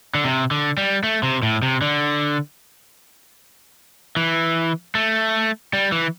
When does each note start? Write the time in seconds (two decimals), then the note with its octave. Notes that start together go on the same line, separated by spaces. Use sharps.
0.15 D3
0.25 C3
0.51 D3
0.77 G3
1.04 A3
1.23 C3
1.43 A2
1.63 C3
1.82 D3
4.17 E3
4.95 A3
5.73 G3
5.92 E3